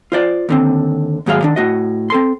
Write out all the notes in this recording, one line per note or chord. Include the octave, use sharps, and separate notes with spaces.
F4 C5 D5
D#2 D3 C4
D#2 G#2 F#3 G#4 F5
D#3 D4
A2 F#4 D#5
C4 A4 C6